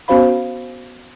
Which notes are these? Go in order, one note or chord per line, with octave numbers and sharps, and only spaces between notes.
B3 C#4 F#4 C5 F5 B5